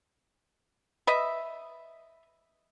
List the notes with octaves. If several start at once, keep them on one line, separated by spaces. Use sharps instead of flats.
B4 D#5 E5